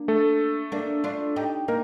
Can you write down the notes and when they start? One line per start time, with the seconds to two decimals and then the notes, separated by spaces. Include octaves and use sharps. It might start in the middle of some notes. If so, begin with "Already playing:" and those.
Already playing: A#3 D4
0.08 A3 A4
0.72 A#3 D4
1.04 D4 F4
1.36 D#4 G4
1.68 A#3 D#4 A#4